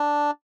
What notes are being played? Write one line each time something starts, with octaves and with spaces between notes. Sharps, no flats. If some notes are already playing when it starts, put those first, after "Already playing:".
Already playing: D4